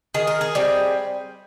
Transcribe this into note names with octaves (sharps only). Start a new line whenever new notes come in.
D#3 G#4
A#4
G#4
G3 C4